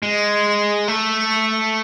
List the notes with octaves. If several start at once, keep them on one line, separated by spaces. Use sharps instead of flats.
G#3
A3